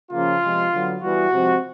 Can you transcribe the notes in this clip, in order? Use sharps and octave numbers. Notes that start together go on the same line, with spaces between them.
C#3 F3 A#3 C#4 F4
C3 F3 G#3
D3 F#3 B3
E3 G3 B3 F#4
C3 F3 G#3 C4